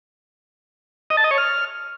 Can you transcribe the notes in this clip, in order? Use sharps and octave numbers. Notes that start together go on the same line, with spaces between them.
D#5
A5
D#5
C#5
F6